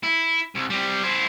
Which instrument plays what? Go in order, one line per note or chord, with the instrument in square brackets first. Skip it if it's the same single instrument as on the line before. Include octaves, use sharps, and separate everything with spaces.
[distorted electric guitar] E4
C2
G3 C4
E4 C5